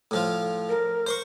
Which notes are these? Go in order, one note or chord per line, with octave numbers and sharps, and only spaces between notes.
A2 F3 F4
A#4
C5 C6 C#6